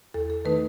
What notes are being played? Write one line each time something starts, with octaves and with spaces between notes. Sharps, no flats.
E2 A4
A4
D#3 A3 D#4 B4